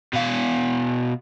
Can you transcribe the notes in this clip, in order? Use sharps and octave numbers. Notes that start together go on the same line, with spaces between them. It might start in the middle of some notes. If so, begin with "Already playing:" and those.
B2 F5